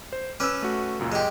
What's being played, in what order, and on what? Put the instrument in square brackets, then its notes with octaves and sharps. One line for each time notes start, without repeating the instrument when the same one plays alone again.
[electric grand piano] C5
[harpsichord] C#4 B4 [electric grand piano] D6 E6
[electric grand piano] A3 F#4
C#2 F#2 A#2
[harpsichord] G#3 G4